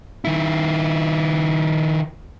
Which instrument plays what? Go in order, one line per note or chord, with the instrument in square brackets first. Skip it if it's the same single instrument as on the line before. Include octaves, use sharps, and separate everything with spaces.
[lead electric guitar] D#3 E4